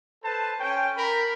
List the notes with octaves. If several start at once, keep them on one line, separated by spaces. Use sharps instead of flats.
A4 B4 C5 A5
C#4 G5
A#4 B5